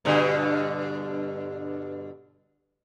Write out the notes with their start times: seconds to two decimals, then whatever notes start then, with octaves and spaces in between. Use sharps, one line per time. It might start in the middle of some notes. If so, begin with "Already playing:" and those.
0.05 G2 B2 D3